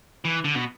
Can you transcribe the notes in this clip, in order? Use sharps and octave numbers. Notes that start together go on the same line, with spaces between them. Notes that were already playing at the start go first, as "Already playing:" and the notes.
E3
D3
B2